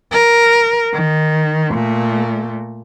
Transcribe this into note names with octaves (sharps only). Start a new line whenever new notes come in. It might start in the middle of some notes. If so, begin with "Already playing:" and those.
A#4
D#3
A#2 A3